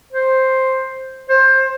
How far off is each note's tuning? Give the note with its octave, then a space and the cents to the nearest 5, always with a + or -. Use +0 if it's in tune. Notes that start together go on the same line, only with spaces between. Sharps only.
C5 +5
C5 +20